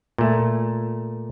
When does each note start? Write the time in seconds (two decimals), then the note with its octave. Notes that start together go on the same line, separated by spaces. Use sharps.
0.18 A#2 A3